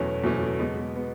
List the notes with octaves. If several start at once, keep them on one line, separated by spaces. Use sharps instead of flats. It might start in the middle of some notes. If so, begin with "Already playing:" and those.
Already playing: E2 B2 F#3 A3 C#4
E2 B2 F#3 A3 C#4
B2 G#3 B3
G#3 B3